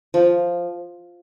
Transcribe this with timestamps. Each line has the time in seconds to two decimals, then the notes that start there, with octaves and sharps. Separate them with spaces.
0.14 F3